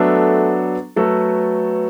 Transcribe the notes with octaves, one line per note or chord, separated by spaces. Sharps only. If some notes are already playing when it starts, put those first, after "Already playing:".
Already playing: F#3 A3 B3 D4 A4
F#3 A3 B3 F#4 A4